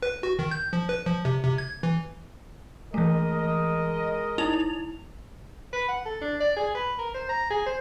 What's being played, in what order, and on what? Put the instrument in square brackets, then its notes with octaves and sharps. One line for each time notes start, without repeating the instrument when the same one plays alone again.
[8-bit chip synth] B4
F#4
D#3
G6
F3
B4
F3
C3
C3
G#6
E3
[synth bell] E3 A3 [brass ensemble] G#3 A#4 D#5
[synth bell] D#4 E4 F7
[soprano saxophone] B4
F#5
A4
D4
D5
G#4
B4
A#4
C5
A#5
G#4
C5